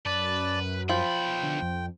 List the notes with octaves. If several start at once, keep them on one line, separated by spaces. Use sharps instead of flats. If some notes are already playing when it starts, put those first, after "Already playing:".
F#2 B4 D5 A5
B1 F3 G5 B5
D3
F2